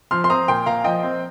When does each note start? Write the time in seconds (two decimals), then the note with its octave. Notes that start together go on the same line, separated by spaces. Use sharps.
0.11 F3 C6 F6
0.24 C6
0.29 C4 A#5 D#6
0.48 A#2 G5 C6
0.66 A#2 F5 A#5
0.84 F3 D#5 G5
1.03 C4